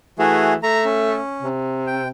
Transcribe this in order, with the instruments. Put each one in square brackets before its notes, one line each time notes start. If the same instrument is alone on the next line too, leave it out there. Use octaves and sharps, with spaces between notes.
[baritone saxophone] E3 [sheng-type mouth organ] A3 F#4 G#4
[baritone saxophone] A3 [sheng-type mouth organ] A#5
[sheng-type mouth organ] C#4
[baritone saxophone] C3
[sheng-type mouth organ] G5